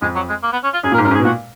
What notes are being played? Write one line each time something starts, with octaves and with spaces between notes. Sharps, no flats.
F2 G#3
F#3
G#3
A#3
B3
C#4
F4
F#2 G#4
A#2 A#4
G#2
F#2 A#4
G#2
G#4
B2
A#2 F#4